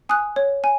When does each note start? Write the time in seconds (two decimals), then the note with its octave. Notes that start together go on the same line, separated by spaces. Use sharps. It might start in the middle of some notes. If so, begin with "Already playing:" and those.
0.09 G#5 D#6 F#6
0.36 C#5
0.64 G#5